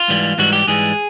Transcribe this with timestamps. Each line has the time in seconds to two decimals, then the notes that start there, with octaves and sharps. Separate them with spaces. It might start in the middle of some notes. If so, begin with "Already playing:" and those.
Already playing: F4
0.08 G#2 E3 G3
0.38 G#2 E3 G3 F#4
0.53 G4
0.67 G#2 E3 G3 G#4